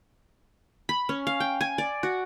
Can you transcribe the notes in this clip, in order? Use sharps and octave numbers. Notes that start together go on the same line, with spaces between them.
B5
C#4
F5
G5
G#5
D5
F#4